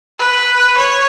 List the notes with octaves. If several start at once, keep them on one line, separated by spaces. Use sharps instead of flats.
B4
C#5